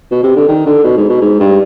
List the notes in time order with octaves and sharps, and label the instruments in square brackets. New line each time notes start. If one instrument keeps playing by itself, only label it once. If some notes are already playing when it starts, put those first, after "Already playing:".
[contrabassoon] B2
C3
D3
D#3
D3
B2
G#2
B2
G#2
G2